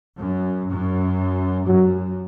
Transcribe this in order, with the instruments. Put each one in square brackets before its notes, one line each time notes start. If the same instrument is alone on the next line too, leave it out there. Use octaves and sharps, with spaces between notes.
[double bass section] F#2
F#2
[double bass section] F#2 [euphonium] F#3